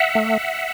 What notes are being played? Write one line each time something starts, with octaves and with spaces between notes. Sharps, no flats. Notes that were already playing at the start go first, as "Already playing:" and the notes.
Already playing: E5 F#5
A3